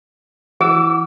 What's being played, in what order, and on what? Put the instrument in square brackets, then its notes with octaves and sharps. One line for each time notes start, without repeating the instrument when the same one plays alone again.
[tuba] E3 [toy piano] G#4 [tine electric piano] F#5 D6 E6